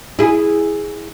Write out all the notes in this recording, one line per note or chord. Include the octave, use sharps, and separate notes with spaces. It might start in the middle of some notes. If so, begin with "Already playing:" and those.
E4 G#4